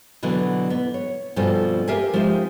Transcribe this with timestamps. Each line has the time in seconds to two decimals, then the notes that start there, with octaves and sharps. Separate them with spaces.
0.23 B2 D3 E3 F#3 B3
0.70 B3
0.94 C#5
1.36 G2 B2 F3 C4 A4 G#5
1.88 G4 A#4 E5 F5 G#5
2.14 F3 G#3 C4 D#4 G4 E5